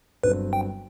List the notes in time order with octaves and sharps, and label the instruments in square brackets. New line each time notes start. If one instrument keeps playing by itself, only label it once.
[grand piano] G1 G2 D3 F#3 C4 [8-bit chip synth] B4
[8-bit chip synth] G5